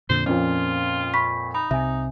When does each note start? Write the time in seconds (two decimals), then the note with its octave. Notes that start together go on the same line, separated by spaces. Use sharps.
0.09 F2 A#2 D3 C5
0.26 F2 A#2 F3 C#4 F4
1.14 B5 C#6 B6
1.55 D#4 B5
1.71 C2 C3 E5 G#5